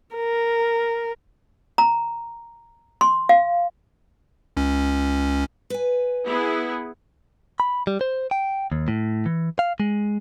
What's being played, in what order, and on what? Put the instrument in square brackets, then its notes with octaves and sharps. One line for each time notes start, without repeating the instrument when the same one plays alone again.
[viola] A#4
[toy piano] A#5
C6
F5
[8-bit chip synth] C#2 C#4
[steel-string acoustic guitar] B4 G#5
[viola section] B3 E4 G#4
[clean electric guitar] B5
G3
C5
G5
D#2
A2
E3
F5
G#3